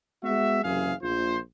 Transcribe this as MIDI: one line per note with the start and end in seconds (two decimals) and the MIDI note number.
0.24 0.63 56
0.24 0.63 59
0.24 0.63 66
0.24 0.63 76
0.64 0.93 30
0.64 0.93 42
0.64 0.93 48
0.64 0.93 52
0.64 0.93 68
0.64 0.93 77
1.02 1.38 34
1.02 1.38 65
1.02 1.38 72